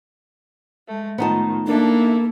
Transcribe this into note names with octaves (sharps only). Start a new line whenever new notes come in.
G#3 A3
A2 D#3 F3 B3 D#4 A5
A#3 D4 E4 A4